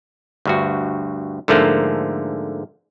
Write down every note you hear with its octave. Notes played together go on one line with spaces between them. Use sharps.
D2 G2 F#4
G#2 D3 F3 A3 A#3